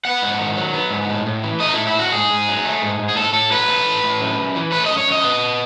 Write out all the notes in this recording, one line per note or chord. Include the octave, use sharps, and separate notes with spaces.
B3 F#5
G#2
D#3
F#3
B3
G#2
A2
A2
E3
A3 D#5
D#4
A2 E4
E4
A2 F#4
G#2 G#4
G#2
F#3
A3
G#2
G#2
G#4
A2 A4
A2 A4
F#3 B4
A3
A2
A2
F#2
F#2
E3
A3 B4
F#2 D#5
C#5
F#2 D#5
B3